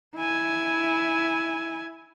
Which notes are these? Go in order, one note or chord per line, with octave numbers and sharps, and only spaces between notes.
E4 G#5